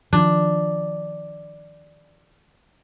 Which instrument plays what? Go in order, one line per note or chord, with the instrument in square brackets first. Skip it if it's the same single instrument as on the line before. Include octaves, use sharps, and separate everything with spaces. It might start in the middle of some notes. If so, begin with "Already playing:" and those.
[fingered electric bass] D#3 F3 [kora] D4